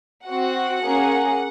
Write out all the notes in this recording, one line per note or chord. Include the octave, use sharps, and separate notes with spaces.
C4 F#4 F#5
A#3 C#4 G#4